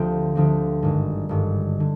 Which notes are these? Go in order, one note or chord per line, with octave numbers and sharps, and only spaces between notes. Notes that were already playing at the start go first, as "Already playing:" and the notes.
Already playing: D2 D3 F3 C4 G4
D2 D3 F3 C4 G4
G#1 G2 D3
G#1 G2 D3
D3